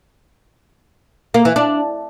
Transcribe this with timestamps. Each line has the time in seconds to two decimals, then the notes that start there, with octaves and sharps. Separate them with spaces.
1.34 A#3
1.45 E3
1.56 D4